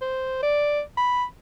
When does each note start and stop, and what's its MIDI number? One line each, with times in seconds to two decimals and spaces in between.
0.01 0.40 72
0.43 0.81 74
0.97 1.24 83